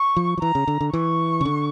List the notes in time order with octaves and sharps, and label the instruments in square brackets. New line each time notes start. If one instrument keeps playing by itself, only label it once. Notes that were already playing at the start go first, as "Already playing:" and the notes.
Already playing: [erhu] C#6
[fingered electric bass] F3
F3
[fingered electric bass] E3 [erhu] A#5
[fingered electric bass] C#3
D3
D3
[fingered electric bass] E3 [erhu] C#6
[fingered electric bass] C#3
D3